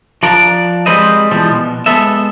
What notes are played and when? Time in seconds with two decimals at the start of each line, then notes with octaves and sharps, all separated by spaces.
0.23 F3 D4 A#4 D5
0.86 G3 G#3 C4 B4 C5 D#5
1.31 B2 E3 F3 G3 G#3
1.51 B2
1.86 G#3 B3 A4 E5